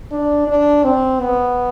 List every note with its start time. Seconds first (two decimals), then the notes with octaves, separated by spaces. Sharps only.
0.12 D4
0.48 D4
0.84 C4
1.21 B3